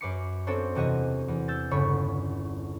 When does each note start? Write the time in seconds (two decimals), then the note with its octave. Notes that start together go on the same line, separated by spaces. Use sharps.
0.01 F#2 B4 D6 C7 C#7
0.47 B3 C4 D4 A4 C5 C#5
0.75 E2 C3 F#4 D#5
1.28 E2
1.48 E6 G6 A6
1.71 G1 C#3 C#5 B5 C#6